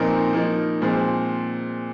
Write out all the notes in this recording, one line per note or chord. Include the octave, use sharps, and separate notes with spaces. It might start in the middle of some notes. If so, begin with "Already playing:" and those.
Already playing: A#2 F3 C4 D#4 A#4
F3 A#3 D#4
A#2 F3 G#3 C4